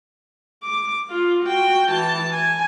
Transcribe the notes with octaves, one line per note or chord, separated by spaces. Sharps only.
D6
F4
F#4 G5
E3 A5
G#5